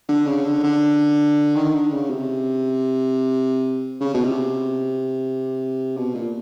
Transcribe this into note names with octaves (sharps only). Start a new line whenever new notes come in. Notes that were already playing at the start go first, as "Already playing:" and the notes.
D3
C#3
D3
D3
D#3
D3
C#3
C3
C#3
B2
C3
B2
A#2